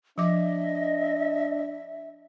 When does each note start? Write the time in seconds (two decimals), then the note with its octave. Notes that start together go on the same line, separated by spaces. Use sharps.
0.18 F3 D4 D#5 E5 D6